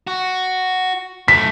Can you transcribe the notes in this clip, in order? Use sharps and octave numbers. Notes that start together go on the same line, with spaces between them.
F#4
F#2 A3 B6